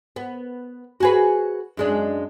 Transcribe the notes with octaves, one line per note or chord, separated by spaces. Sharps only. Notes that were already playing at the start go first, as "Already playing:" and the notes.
B3
F#4 G#4 B4
F#2 G#3 D4